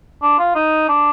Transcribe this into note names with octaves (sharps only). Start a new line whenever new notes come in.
D4
F4
D#4
D4